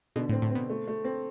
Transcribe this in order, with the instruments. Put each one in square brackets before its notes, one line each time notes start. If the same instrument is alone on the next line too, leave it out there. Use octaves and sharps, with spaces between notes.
[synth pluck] B2 [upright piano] D3
[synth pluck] A2 [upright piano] C4
[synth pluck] A2
[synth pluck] B2 [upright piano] C4
[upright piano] A3
A3
C4